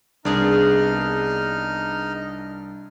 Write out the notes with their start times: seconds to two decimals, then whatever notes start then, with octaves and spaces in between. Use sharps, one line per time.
0.25 C2 B3 D4 D#4 G#4 A#4 D#5 F6